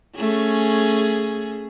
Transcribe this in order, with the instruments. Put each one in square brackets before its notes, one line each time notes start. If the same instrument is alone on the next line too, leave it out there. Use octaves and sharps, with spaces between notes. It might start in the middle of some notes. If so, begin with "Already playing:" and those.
[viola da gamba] A3 C#4 G#4